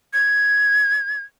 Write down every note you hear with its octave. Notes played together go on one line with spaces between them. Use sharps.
G#6